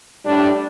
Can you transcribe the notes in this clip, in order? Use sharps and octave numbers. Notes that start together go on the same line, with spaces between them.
A2 G3 D4